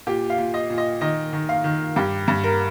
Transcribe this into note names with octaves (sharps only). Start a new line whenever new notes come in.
A#2 G4
F5
A#2
D#5
A#2
D#5
D#3 D#5
D#3
F5
D#3
G2 G4
G2
A#4